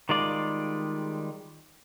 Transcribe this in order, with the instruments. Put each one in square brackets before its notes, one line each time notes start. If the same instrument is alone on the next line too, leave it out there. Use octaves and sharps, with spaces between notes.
[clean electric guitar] D#3 G3 G#3 F4 D5